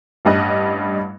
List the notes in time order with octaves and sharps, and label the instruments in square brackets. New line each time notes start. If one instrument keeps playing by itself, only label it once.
[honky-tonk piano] A1 G2 G3 D#5 F#6